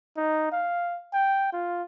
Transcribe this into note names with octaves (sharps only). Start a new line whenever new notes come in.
D#4
F5
G5
F4